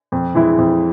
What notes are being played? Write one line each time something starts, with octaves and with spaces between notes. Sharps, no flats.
F2
E3 G#3 E4
F2